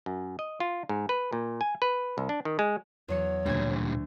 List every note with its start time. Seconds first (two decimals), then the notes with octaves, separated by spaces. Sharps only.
0.06 F#2
0.39 D#5
0.60 F4
0.89 G#2
1.09 B4
1.33 A#2
1.61 G#5
1.82 B4
2.18 C2
2.29 D4
2.45 D#3
2.59 G#3
3.08 E2 F#3 C#5 C#7
3.46 D2 A#2 G3 G#6